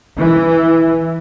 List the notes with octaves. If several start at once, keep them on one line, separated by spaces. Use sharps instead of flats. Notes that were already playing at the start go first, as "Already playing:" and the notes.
E3